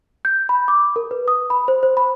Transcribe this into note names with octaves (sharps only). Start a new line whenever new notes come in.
G6
B5
D6
A#4
B4
D#6
B5
C5
C5
B5